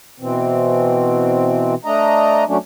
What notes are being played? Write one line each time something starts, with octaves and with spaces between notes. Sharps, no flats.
B2 E3 C4
A3 D4 D#5 A#5
F#3 A3 C#4 D4